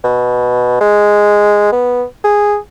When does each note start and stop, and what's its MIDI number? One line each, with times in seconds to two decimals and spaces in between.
0.04 0.81 47
0.81 1.71 56
1.72 2.05 59
2.24 2.57 68